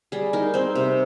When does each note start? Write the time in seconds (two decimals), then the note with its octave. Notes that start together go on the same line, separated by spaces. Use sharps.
0.12 G3 G#4
0.33 D#4 A#4
0.54 C4 C5
0.75 C3